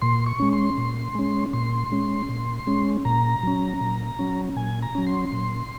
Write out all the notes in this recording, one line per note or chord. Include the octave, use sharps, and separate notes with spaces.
A#2 C6
C#6
G#3 C#4
C6
A#2
G#3 C#4
A#2 C6
G#3 C#4
A#2
G#3 C#4
A#2 A#5
F#3 C#4
A#2
F#3 C#4
A#2 G#5
A#5
F#3 C#4
C6
A#2